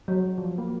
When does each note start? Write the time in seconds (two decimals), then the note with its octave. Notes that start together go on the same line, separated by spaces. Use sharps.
0.08 F#3
0.38 F3
0.58 A#3